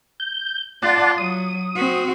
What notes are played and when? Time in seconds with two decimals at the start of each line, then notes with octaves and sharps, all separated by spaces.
0.20 G6
0.82 F4 D5 F#5 A5
1.18 F#3 D#6
1.76 C4 F#4